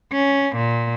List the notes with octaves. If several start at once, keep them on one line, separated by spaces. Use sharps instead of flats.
C#4
A#2